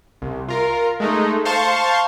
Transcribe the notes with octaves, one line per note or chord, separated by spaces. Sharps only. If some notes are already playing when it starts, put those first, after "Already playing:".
C2
F4 A#4
G#3 A3 D#4
C5 F5 A5 C6 C#6